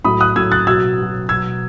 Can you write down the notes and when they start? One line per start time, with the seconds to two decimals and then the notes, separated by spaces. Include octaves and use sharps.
0.04 A2 F#3 B5 D#6
0.21 D#6 F#6
0.36 A2 F#3 E6 G#6
0.52 F#6 A6
0.67 B2 F#3 E6 G#6
0.98 B2 F#3
1.29 B2 F#3 E6 G#6